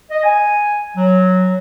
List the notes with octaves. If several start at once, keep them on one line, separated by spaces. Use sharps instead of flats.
D#5
G#5
F#3